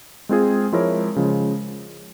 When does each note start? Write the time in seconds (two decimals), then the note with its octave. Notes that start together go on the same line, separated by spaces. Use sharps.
0.29 G#3 C4 F4 G#4
0.72 F3 G#3 E4 A#4 C#5
1.16 C#3 F3 G#3